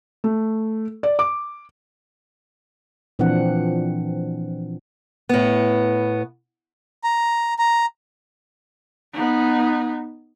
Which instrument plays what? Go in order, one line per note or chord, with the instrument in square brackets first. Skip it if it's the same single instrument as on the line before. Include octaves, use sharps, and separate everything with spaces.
[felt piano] A3
D5
D6
[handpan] A#2 E3 F3 C4 D4 F#5
[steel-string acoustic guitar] A2 B3
[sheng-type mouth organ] A#5
A#5
[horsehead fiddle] B3 D#4